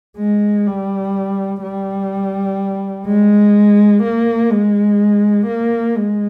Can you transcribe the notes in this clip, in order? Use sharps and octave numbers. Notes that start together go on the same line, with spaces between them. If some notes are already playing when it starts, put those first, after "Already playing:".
G#3
G3
G3
G#3
A#3
G#3
A#3
G#3